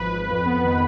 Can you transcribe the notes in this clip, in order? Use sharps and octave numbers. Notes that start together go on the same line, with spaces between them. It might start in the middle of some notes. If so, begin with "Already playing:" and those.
Already playing: G#1 F3 B4
G#1
F2
B3
D#3